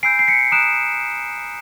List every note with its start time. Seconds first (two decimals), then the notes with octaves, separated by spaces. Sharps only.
0.03 G#5 B5 E6 G6 C7 D7
0.19 C7
0.28 B6 C#7
0.52 A#5 D#6 F#6 D7 E7